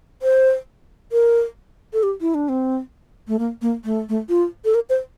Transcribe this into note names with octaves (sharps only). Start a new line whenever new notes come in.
C5
A#4
A4
G4
E4
D4
C4
A3
A#3
A#3
A3
A3
F4
A4
A#4
C5